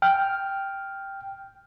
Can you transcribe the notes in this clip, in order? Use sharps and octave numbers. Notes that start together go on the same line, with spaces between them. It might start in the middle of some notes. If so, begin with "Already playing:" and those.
G5 F6